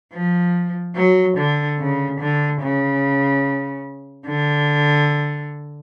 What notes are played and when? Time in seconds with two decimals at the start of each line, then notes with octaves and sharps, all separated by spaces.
0.13 F3
0.96 F#3
1.37 D3
1.79 C#3
2.20 D3
2.61 C#3
4.27 D3